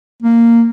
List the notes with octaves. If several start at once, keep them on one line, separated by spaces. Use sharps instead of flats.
A#3